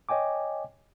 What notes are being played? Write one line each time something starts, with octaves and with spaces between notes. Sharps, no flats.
C#5 D#5 G5 G#5 D6